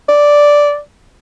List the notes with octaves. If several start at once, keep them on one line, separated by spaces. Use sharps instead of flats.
D5